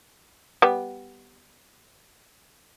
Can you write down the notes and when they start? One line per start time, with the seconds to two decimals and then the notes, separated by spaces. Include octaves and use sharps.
0.62 G3 B3